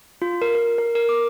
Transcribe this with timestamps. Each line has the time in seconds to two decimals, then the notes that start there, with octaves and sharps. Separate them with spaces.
0.22 F4
0.42 A#4
0.55 A#4
0.78 A#4
0.95 A#4
1.09 D6